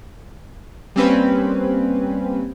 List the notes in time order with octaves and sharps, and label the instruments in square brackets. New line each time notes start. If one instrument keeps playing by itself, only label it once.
[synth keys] G3 A#3 C4 C#4 B4